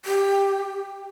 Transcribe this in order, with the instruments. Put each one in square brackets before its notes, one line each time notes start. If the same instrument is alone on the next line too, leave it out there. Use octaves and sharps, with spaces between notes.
[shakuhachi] G4